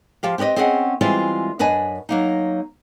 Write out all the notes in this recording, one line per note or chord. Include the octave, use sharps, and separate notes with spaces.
F3 G4 F5
C4 G4 B4 D5 D#5
C4 C#4 G#4 D#5 F5 F#5
E3 G3 G#3 C4 E4 F4
F#2 D4 B4 D#5 G#5
F#3 A#3 D#4